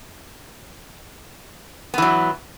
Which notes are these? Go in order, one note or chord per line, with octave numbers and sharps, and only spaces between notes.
E3 F#3 B3